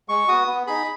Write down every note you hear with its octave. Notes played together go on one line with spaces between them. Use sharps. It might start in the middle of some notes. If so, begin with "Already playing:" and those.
G#3 C#6
B3 F#4 D#6
B3
D#4 G#4 B5